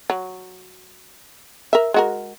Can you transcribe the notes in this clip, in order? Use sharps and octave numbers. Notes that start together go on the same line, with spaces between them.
F#3
A#4 E5
G#3 F#4 A#4